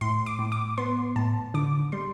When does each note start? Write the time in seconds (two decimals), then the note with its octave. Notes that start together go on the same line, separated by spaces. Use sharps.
0.01 A2 C6
0.26 D6
0.39 A2
0.52 D6
0.78 B3 C6
1.16 A2 A5
1.54 D3 D6
1.92 G3 C6